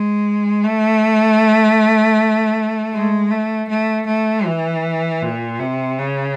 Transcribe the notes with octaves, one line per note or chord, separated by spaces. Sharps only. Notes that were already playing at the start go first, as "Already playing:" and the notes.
Already playing: G#3
A3
G#3
A3
A3
A3
E3
A#2
C3
C#3